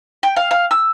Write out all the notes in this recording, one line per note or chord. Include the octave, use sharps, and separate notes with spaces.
G5
F5
F5
E6